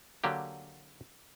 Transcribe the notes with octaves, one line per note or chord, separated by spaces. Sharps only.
D3 F#3 A#3 G4